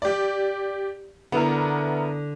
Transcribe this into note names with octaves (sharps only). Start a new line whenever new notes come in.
G4 D5
D3 B3 E4 A#4